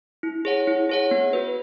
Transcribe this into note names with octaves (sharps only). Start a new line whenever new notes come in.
E4
G#4 C#5 F#5
E4
G#4 C#5 F#5
B3
F#4 B4